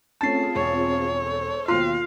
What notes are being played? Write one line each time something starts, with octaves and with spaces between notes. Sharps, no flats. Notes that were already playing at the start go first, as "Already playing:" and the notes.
A3 C4 C#4 F4 G#4 A5 A6 C7
E1 C#5
A4 C5
D#2 B2 F4 F5 C6